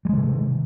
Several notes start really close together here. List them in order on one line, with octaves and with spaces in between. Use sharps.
G3 G#3 D#3 C3